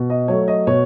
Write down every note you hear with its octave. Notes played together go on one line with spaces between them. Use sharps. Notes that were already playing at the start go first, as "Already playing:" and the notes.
Already playing: B2
D#5
F#3 A3 C#5
D#5
B2 C#5